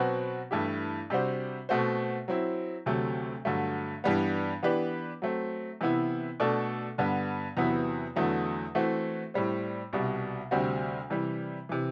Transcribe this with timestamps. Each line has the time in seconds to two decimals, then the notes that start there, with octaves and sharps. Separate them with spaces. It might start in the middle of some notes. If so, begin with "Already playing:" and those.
Already playing: B2 F#3 C4 F#4 B4
0.51 G2 E3 A3 E4 G4
1.10 C3 G3 D4 F#4 C5
1.69 B2 A3 C4 F#4 C5
2.28 F#3 C4 E4
2.86 D2 C3 F#3 A3
3.45 G2 D3 F#3 A3
4.04 G2 E3 G3 B3
4.63 E3 B3 D4 G4 B4
5.22 F#3 A3 C4
5.81 C3 E3 B3 E4
6.40 B2 A3 D4 A4
6.98 G2 D3 G3 B3
7.57 E2 C3 F#3 B3 E4
8.16 E2 D3 F#3 A3 E4
8.75 E3 A3 C4 F#4
9.34 A2 G3 C4
9.93 C2 B2 G3
10.51 D2 C3 G3 C4 F#4
11.10 C3 E3 G3
11.69 C3 E3